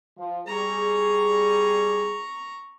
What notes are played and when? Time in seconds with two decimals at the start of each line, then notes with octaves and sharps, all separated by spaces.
0.17 F3
0.47 G3 G#4 A#5 C#6